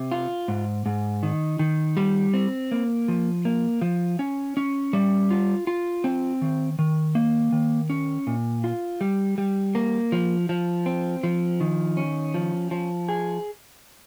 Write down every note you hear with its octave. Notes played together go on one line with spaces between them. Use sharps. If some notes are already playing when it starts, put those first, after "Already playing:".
Already playing: C3
F4
G#2
G#2
D#3
D#3
G3
C4
A#3
F3
A#3
F3
C#4
C#4
G3
F4
F4
C4
D#3
D#3
A#3
D#3
C#4
A#2
F4
G3
G3
A#3
F3
F3
C4
F3
D#3
C#4
F3
F3
G#4